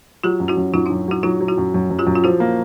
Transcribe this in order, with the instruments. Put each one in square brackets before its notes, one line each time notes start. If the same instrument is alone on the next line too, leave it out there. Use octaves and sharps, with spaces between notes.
[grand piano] F#3 [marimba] F4 G4
[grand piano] F#2
[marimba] E4 F#4
[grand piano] F#2
[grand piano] F#2 [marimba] D#4 F4
[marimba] D4 E4
[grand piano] F#2
[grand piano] F#3 [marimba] E4 F#4
[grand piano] F#3 [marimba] D#4 F4
[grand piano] F#3
[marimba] E4 F#4
[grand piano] F#2
F#2
F#2
[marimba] F4 G4
[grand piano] F#2
[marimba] F4
[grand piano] F3 [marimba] E4 F#4
[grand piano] A#3